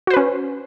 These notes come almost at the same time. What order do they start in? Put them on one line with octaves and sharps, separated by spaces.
F#4 C5 B4 C#4